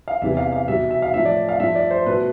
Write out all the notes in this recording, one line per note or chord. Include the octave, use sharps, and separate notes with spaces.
F5
E2 C3 E3 G3 E5
F5
F5
B2 G3 E5
E5
F5
A2 F3 A3 E5
D5
F5
G2 F3 A3 E5
D5
C5
B2 A3 B4